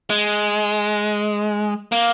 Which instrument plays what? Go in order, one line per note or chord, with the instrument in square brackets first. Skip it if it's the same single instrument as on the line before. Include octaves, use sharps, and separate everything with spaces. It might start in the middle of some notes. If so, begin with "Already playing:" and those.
[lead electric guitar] G#3
A#3